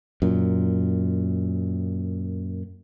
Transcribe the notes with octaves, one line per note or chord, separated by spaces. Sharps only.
F#2 A#2